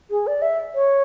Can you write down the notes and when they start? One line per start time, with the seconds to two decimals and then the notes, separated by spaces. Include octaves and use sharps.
0.10 G#4
0.27 D5
0.42 E5
0.74 C#5